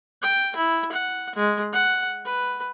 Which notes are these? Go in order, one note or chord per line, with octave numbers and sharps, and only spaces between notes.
G5
E4
F#5
G#3
F#5
B4